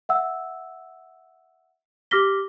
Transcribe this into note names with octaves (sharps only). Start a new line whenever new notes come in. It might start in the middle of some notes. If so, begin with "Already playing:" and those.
E5 F#5 E6
G4 D6 F6 A#6 B6 G7